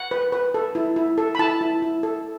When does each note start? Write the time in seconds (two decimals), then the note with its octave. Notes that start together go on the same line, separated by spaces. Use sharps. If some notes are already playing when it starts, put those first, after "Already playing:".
Already playing: F#5
0.11 B4
0.32 B4
0.54 A4
0.75 E4
0.96 E4
1.18 A4
1.35 B5
1.39 E4 A5
1.61 E4
1.82 E4
2.03 A4